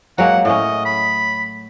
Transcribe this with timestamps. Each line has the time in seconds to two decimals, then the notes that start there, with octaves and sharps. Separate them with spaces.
0.18 F#3 G#3 A#3 F#5
0.45 A2 C#4 D#5
0.85 B5